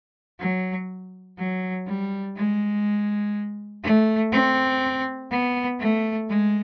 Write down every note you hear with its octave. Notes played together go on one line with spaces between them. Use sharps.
F#3
F#3
G3
G#3
A3
C4
B3
A3
G#3